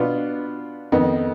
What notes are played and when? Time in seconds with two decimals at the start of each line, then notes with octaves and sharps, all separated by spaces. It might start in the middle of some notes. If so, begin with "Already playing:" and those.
Already playing: B2 B3 D4 F4
0.92 F2 D#3 B3 D#4